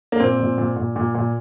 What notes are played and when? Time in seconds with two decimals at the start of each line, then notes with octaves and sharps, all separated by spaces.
0.12 A#3
0.20 A#2 C4
0.39 A#2
0.58 A#2
0.76 A#2
0.96 A#2
1.15 A#2